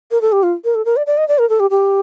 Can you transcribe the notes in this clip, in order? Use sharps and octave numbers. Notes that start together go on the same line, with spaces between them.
A#4
A4
G4
F4
A#4
A4
A#4
D5
D5
D#5
D5
A#4
A4
G4
G4